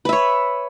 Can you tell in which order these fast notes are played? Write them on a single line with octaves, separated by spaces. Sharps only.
B4 E5 C#5